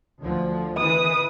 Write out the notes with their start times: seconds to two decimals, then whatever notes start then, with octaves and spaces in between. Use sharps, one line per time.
0.21 D2 D3 F3
0.77 E3 B4 D#6